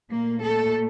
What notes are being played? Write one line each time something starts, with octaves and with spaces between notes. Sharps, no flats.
A#2 A3 A#3
A4